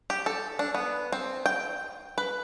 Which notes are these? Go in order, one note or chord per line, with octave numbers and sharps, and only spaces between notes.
G4
A4
D4
B3
C4
G5
B4